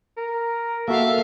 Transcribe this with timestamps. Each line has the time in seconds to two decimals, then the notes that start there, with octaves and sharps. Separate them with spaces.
0.17 A#4
0.88 A#3 F#4 A4 E5 F5